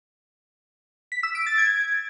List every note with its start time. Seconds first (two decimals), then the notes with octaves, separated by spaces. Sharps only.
1.12 B6
1.23 E6
1.35 D7
1.46 A6
1.58 G#6